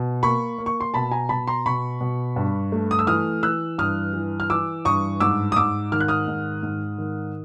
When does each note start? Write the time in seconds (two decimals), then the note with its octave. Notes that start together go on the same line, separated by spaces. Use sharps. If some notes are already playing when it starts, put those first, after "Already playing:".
Already playing: B2
0.23 A#3 B5 C#6
0.58 A#3
0.66 C#6
0.81 C6
0.94 B2 A5 B5
1.11 G#5 A#5
1.29 B2 A5 B5
1.48 A#5 C6
1.66 B2 B5 C#6
2.01 B2
2.36 G2
2.72 A3
2.91 D#6
2.99 E6
3.07 E3 D#6 F6
3.43 E3 E6 F#6
3.78 G2 D#6 F6
4.14 E3
4.40 F6
4.50 E3 D6 E6
4.85 G2 C#6 D#6
5.20 G#2 D6 E6
5.52 D#6
5.56 G#2 D6 E6
5.92 D#3 F6
6.01 F#6
6.08 D#6 F6
6.28 G#2
6.63 G#2
6.98 D#3